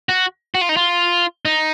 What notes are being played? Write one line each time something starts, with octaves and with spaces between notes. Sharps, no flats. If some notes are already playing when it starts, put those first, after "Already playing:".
F#4
F#4
F4
D#4
F4
D#4